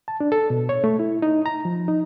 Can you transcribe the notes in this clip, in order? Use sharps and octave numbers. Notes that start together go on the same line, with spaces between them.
A5
D4
A4
B2
C#5
A3
E4
D#4
A#5
F3
D#4